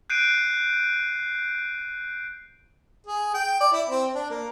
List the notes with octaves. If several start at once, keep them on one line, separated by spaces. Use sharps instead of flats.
F#6 G6 C7 D7 D#7
G#4
G5
D5
E4
C4
D4
A#3